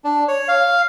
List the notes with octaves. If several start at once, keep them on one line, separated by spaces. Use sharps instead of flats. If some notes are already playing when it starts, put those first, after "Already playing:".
D4
C#5
F5